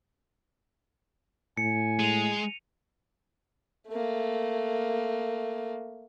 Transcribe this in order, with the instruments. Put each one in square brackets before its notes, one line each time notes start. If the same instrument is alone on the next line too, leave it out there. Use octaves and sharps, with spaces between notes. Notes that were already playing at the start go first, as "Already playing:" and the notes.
[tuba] A2 [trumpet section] G#5 [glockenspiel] C#7
[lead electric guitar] G#3 [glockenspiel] D#7 F7
[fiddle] A3 A#3